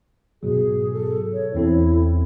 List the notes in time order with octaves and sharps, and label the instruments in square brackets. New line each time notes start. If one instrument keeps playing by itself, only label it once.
[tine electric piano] G#2 B2 F#3 [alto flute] G#4
[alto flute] A4
C#5
[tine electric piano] E2 C4 A4 [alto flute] E4